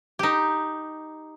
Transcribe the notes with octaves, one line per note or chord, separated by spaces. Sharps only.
D#4 G4